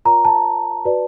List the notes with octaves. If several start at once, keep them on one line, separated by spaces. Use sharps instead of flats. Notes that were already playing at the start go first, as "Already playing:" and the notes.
F4 A#4 C#5 A#5
A5
F#4 B4 D5